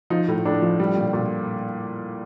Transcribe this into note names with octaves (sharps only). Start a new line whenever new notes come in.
F3 D#4
A2
A2 D4
F3
G3
A#2
A#2